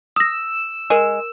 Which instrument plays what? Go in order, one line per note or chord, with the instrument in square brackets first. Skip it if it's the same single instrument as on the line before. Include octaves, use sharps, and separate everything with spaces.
[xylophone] D#6 A#6 [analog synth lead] E6
[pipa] G#3 [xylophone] A#4 D#7